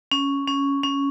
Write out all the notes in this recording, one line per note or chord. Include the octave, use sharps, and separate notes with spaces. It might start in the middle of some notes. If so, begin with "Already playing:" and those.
C#4
C#4
C#4